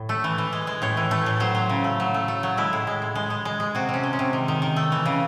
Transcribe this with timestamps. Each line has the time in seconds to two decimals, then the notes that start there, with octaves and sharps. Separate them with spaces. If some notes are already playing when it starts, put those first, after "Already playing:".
Already playing: A2
0.09 A3
0.24 E3
0.38 E3
0.53 G#3
0.67 G#3
0.82 A2 C#5
0.97 E3
1.11 A3
1.26 A2
1.40 F#3 C5
1.55 F#3
1.69 C#3
1.84 A3
2.00 F#3
2.14 A3
2.28 A3
2.43 F#3
2.57 G#3 E4
2.73 A2
2.87 G#3
3.02 A2
3.15 G#3
3.30 G#3
3.45 G#3
3.60 G#3
3.75 C3 F#4
3.89 C3
3.94 C#4
4.03 G#3
4.13 C#4
4.19 C3
4.33 D#3
4.48 D#3
4.62 D#3
4.76 A3
4.92 E3
5.06 C#3